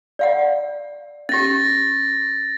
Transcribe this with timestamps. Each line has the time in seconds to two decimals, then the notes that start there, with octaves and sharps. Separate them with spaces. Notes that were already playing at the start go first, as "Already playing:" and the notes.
0.19 D5 F5 F#5
1.29 C#4 G4 A6 A#6